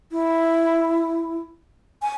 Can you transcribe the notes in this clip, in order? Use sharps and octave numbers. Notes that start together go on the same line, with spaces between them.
E4
G#5